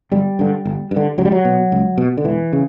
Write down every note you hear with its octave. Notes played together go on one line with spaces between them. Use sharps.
G1 G3
G2 D3
G1
G2
D3
C#2 F#3
G3
F#3
B2
C#2
B2
D3
E1 E3
C#3